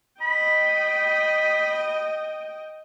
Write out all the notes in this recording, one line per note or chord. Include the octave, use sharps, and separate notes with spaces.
D#5 G5 B5